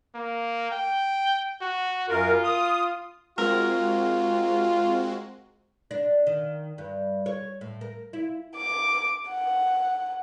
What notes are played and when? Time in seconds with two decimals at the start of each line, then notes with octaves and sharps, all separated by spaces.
0.15 A#3
0.72 G5
1.61 F#4
2.09 F#2 F4 A#4
2.43 D#6
3.38 G#3 C4 F4 F#4 A#4
5.91 D4
6.27 D#3
6.78 G2
7.26 C#5
7.61 A2
7.81 A#4
8.13 E4
8.56 D6
9.31 F#5